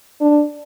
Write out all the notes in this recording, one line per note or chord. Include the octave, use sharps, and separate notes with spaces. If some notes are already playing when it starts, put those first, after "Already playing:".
D4